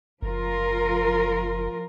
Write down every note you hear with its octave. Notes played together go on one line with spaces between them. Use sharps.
F#1 F3 F4 A#4